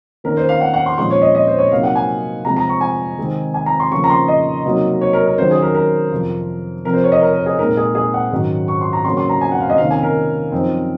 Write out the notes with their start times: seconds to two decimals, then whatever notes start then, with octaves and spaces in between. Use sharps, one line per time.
0.24 D#3 A#3 C#4 A#4
0.37 C5
0.49 F5
0.61 F#5
0.74 F#5
0.86 C6
0.98 A#2 F3 G#3 C#4 C6
1.11 C#5
1.22 D#5
1.35 D#5
1.47 C5
1.58 C#5
1.72 C3 F#3 A#3 D#4 F5
1.83 F#5
1.95 G#5
2.44 C3 F3 G#3 A#5
2.57 A#5
2.69 C#6
2.81 G#5
3.18 C3 D#3 G#3 C4 D#4
3.54 G#5
3.66 A#5
3.80 C6
3.92 C#3 F3 A#3 C#4 C#6
4.04 A#5
4.10 C6
4.28 D#5
4.65 C3 F#3 A#3 D#4
5.01 C#5
5.13 A#4
5.26 A#4
5.38 D#3 F#3 C#4 C5
5.51 G#4
5.62 A#4
5.75 A#4
6.11 F2 C3 F3
6.85 F2 C3 F3 C4 A#4
6.94 C5
7.04 C#5
7.12 D#5
7.22 A#4
7.33 A#4
7.46 G#4
7.58 A#2 G#3 C4 D#4 A#4
7.77 G#4
7.95 G#4
8.14 F#5
8.32 G#2 D#3 F#3 C#4
8.68 C#6
8.81 C6
8.93 A#5
9.05 C#3 F#3 A#3 C#4 C6
9.17 C6
9.29 A#5
9.41 G#5
9.52 F#5
9.60 F5
9.70 D#5
9.78 C3 D#3 A#3 C#4 F5
9.91 G#5
10.03 A#4
10.52 F#2 F3 C4 D#4